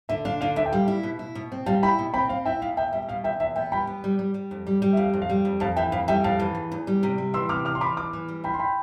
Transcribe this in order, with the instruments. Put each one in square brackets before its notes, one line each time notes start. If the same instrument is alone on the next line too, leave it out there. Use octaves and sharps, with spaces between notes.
[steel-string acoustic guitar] D3 [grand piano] E5
[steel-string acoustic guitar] D4 [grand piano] F5
[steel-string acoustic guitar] D3 [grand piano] F5
[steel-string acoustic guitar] D2 [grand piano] E5
[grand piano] G5
[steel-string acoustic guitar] G3 [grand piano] F5
[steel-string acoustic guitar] E4
B2
E4
B2
C4
[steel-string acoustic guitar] G3 [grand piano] F5 A5
[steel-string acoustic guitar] E4 [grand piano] G5 B5
[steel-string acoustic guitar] B2
[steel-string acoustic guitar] C4 [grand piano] G5 B5
[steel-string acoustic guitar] C4 [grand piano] F5
[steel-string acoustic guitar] E4 [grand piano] E5 G5
[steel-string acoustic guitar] B2 [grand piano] F5
[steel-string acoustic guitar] E2 [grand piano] E5 G5
[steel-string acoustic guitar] G3 [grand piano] E5
[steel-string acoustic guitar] B2 [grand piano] F5
[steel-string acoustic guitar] E2 [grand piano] E5 G5
[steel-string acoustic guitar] E2 [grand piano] E5
[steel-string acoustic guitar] B3 [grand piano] E5 G5
[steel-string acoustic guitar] G3 [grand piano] G5 B5
[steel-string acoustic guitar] B3
G3
G3
G3
F2
G3
G3
[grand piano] E5
[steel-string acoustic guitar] F2 [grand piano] F5
[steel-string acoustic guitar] F2
[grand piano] F5
[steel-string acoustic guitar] G3
F2
[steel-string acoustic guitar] F2 [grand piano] F5 A5
[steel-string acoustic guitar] E3 [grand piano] E5 G5
[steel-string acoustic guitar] F2 [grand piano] F5
[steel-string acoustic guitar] G3 [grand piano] E5 G5
[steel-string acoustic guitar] F2 [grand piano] F5 A5
[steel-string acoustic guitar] E3
E2
E2
G3
C3
G3
[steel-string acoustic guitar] E3 [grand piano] C6 E6
[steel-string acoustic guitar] C3 [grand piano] D6 F6
[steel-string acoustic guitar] E2 [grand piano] D6 F6
[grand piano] C6
[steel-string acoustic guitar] E3 [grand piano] B5 D6
[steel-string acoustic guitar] E2 [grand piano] D6 F6
[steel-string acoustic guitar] E3
G3
[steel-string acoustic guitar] D4 [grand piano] G5 B5
[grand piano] C6
G5 B5